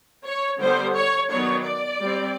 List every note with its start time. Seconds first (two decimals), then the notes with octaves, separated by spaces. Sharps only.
0.25 C#5
0.60 D3 G3 B3 C5
0.95 C#5
1.30 D#3 F#3 B3 D4 C#5
1.65 D5
2.01 G3 C4